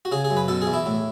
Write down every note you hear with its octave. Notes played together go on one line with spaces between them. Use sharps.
F#4
C#3 G#4
G#4
F#2
B4
B2 A4
G#4
E2
E4
A2